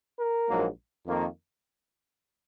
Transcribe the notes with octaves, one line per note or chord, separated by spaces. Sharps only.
A#4
A#1 G#2 F#3 A#3
F2 D#3 A#3